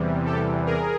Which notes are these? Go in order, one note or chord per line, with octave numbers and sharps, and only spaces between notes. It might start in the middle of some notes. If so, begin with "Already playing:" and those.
Already playing: E2 C3 E3 G3
G4 A4
G#4 A#4